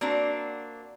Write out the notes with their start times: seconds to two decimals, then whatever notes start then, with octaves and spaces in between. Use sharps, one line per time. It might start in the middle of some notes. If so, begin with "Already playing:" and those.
0.01 A#3 C4 D4 F#4